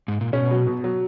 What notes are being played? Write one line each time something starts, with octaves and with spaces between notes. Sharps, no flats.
G#2
A#2
B2 C#4
F#3
B2
F#3